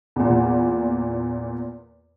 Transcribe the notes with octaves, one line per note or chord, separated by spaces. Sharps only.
E2 A#2